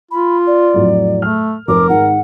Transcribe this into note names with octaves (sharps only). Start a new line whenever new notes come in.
F4 B5
D5
F2 A2 F#3
A3 F6
F1 A#4 D6
G#2 D#3 F#5